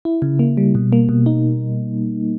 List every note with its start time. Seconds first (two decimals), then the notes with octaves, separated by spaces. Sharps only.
0.05 E4
0.22 C#3
0.39 A#3
0.57 G3
0.75 B2
0.93 A#3
1.09 B2
1.26 D#4